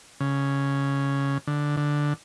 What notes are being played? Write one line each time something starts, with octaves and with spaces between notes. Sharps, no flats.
C#3
D3
D3